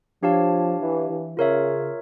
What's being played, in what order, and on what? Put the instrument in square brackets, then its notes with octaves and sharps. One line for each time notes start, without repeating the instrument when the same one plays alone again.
[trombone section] F3 [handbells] D4 G4 C#5 F5 A5
[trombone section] E3
E3
[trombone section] C#3 [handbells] F4 A#4 C#5 E5